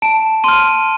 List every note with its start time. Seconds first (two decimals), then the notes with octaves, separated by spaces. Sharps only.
0.02 A5 D7
0.44 C6 F6 D#7